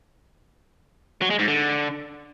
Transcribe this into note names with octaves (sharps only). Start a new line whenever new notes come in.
F#3
G#3
G#2
D3